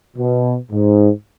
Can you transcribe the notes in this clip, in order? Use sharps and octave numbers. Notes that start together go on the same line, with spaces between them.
B2
G#2